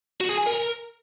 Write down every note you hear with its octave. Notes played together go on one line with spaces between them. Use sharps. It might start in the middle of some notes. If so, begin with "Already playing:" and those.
F#4
G#4
G#5
A#4